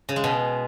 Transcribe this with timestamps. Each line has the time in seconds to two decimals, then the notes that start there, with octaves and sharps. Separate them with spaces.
0.09 C#3
0.16 G#3
0.24 B2